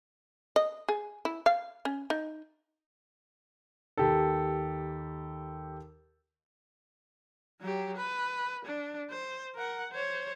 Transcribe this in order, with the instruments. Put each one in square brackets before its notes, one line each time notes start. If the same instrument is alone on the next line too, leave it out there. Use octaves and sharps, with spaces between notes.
[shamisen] D#5
G#4
E4
F5
C#4
D#4
[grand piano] D#2 G4 A4
[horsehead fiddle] F#3 G4
B4
D4
C5
A#4 F#5
C5 C#5